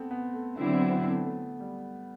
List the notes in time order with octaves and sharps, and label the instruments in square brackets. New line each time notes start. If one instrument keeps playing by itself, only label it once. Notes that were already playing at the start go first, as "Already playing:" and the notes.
Already playing: [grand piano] A3 B3 C4
B3
A3
[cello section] D3 F#3 C4 E4 [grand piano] B3
[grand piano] B3
B3
A3
A3
G3